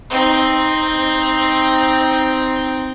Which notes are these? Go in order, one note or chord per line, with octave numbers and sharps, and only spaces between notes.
C4 D#4